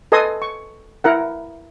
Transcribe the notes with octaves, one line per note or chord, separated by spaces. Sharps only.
A4 B4 D#5 G#5 C6 D#6
C#6
E4 A#4 F#5